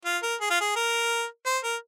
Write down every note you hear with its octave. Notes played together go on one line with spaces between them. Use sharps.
F4
A#4
G#4
F4
G#4
A#4
C5
A#4